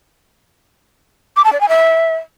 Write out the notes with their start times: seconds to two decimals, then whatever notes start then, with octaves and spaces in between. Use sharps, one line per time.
1.36 D6
1.44 A5
1.52 D5
1.60 G#5
1.69 E5